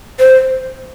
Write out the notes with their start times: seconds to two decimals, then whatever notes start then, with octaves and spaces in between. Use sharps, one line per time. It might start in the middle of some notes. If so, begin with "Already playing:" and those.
0.20 C5